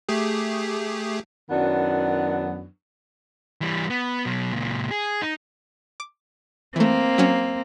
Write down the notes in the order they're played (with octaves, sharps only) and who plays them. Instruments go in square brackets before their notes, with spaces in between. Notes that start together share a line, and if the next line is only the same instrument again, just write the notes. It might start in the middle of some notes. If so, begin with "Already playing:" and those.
[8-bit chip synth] A3 G4 G#4
[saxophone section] F#2 D#3 F#3 B3 D4 E4
[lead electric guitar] E3 G3
B3
B2 F#3
C#2 A#2
G#4
D#4
[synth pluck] D6
[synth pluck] E3 A3 [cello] A#3 C4
[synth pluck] F#3 C#4